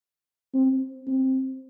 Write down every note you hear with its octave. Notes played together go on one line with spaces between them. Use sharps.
C4
C4